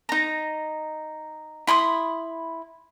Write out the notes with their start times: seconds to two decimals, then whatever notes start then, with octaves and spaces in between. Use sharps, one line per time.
0.09 D#4 A#5
1.67 E4 B5 C6 D#6